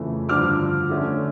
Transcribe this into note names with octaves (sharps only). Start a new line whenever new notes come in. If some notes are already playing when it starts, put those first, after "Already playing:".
Already playing: F2 C#3 E3 A3
G2 D3 F3 D6 F6
D3 A3 C#4